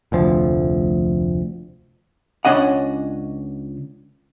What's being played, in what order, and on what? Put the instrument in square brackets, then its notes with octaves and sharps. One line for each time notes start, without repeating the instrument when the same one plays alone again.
[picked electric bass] F1 D2 F3
[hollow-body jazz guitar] C#2 C#4 D4 D#5 F#5